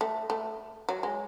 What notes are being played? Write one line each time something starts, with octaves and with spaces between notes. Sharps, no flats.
A3
A3
F#3
G#3